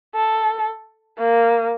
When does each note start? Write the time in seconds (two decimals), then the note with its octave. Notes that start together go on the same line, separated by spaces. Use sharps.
0.15 A4
1.19 A#3